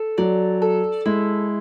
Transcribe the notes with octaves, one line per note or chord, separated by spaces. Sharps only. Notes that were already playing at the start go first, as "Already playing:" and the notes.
Already playing: A4
F#3 D5
A4
G#3 E4